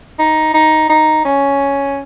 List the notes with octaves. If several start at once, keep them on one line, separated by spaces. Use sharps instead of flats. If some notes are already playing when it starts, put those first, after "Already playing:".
D#4
D#4
D#4
C#4